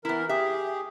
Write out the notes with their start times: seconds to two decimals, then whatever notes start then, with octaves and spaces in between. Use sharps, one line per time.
0.05 E3 B3 E4 A#4
0.29 G4 G#4 E5